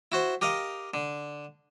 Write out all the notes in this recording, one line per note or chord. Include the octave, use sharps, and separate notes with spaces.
E4 F#4 C5
G4 A#4 D#5 F5
D3